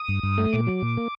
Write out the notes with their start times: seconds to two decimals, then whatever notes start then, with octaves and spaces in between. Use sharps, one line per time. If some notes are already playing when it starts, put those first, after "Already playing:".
Already playing: D#6
0.09 G2
0.23 G2
0.38 A3
0.52 A#2 D6
0.67 F#3
0.82 A#2
0.97 A#3